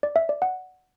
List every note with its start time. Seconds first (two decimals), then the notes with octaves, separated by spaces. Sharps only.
0.03 D5
0.16 E5
0.29 D5
0.42 F#5